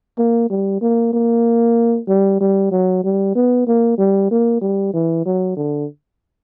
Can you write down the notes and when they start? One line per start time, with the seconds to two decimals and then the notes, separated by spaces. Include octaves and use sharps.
0.18 A#3
0.50 G3
0.81 A#3
1.13 A#3
2.08 G3
2.40 G3
2.71 F#3
3.04 G3
3.35 B3
3.67 A#3
3.98 G3
4.31 A#3
4.61 G3
4.94 E3
5.26 F#3
5.57 D3